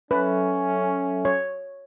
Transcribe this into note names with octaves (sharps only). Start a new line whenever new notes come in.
F#3 C#4 A4 B4 E5
C#5